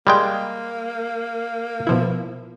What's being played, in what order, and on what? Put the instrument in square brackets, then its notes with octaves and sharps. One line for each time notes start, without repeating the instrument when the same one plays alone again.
[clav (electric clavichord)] G3 G#3 G5 [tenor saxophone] A#3
[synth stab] B2 F3 E4